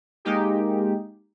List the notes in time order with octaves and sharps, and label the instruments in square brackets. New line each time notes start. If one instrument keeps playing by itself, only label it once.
[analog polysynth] G#3 A#3 D#4 G4